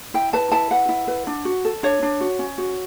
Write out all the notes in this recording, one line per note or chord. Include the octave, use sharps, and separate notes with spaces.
E4 G5
B4 A5
E4 A5
B4 F#5
E4
B4
D4
F#4
A4
D4 C#5
D4
F#4
C#4
F#4